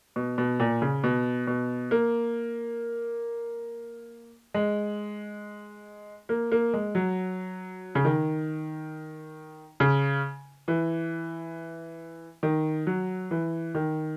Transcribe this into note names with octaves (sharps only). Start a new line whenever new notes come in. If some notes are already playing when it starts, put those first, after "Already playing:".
B2
B2
A#2
C#3
B2
B2
A#3
G#3
A#3
A#3
G#3
F#3
C#3
D#3
C#3
E3
D#3
F#3
E3
D#3